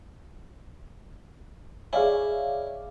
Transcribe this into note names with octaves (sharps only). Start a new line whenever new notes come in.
E4 G#4 C#5 D5 F5 G#5